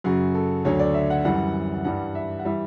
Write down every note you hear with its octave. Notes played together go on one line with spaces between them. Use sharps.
F#2 C#3 F#3 F#4
A4
D2 D3 F#3 C#5
D5
E5
F#5
F#2 E3 G3 F#5
G2 E3 G3 F#5
E5
F#5
E3 G3 E5